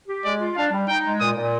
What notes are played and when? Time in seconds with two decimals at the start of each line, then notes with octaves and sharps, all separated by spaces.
0.08 G4
0.24 G#3 D5
0.40 F4
0.56 D4 F5
0.72 G3
0.88 D#4 G5
1.04 G#3
1.20 A#2 D#6
1.36 A#2